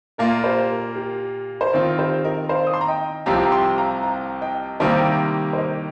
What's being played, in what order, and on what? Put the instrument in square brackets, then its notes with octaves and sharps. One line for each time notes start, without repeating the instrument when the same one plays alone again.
[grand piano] A#2 A#3 F4 [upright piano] A#4
[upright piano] G4 C5
A#4
G4
C5
[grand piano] D#3 C4 F4 [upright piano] A#4
[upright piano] G4 C5
A#4 D#5
C5 F5
D#6
C6
A#5
D#5 G5
[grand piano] C2 C3 F3 C4 G4 [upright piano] F5 A#5
[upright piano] A#5
G5 C6
F5 A#5
F5 A#5
D#5 G5
[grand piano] C3 D#3 G3 A#3 G4 [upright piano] C5 F5
[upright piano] C5
A#4 D#5